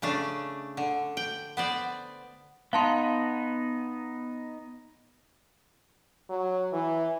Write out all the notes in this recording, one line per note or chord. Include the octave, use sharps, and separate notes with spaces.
C#3 A3 D4
D3
G5
B3 C5 D5
B3 D#4 F5 A5 C6
F#3
E3